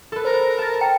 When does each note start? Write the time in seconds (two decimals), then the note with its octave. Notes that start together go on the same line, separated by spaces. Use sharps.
0.12 A4 B4
0.25 A#4 C5
0.58 A5 A6
0.81 G5 A#5